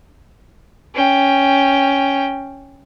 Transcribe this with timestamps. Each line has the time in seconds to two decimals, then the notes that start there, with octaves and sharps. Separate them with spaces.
0.95 C#4 G5